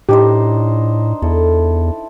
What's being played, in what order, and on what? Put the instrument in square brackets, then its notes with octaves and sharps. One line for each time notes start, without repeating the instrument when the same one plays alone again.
[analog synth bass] A2 [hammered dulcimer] D4 D#4 C5 [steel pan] G4
[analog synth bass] E2 [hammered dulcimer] E4 A4